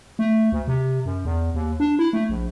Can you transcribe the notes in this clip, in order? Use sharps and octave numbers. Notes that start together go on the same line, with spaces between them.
A3
D2
C3
F#2
E2
D#2
D4
E4
A3
A#1